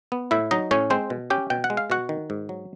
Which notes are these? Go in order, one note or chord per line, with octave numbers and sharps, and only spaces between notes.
B3
A2 E4 E5
F#3 D#4 D#5
A2 C#4 C#5
G#3 C4 C5
B2
C#4 G4 G5
B2 G5
F#5
G#3
F5
B2 F#4 F#5
D#3
G#2
F#3